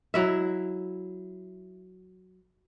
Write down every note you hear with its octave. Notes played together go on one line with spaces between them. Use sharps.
F#3 E4 E5